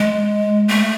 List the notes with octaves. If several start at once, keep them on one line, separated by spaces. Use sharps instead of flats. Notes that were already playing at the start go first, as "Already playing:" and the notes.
Already playing: G#3
A3